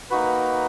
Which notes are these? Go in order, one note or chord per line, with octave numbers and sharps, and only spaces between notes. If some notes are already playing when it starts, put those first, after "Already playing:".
A#3 D#4 F#4 B4